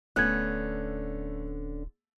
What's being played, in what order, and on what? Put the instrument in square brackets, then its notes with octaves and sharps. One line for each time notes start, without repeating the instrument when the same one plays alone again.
[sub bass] D1 [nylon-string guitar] D3 B3 C#4 [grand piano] A3 [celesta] F#6 G#6